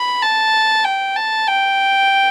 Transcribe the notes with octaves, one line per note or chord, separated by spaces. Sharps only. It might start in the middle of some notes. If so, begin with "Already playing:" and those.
Already playing: B5
A5
G5
A5
G5